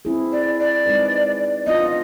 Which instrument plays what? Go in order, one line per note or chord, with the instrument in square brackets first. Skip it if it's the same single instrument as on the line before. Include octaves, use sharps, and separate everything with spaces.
[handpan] C4 E4 G#4
[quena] D5
D5
[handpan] G#3 C4 D#4 G#4 B4
[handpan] B3 D4 F4 [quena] D#5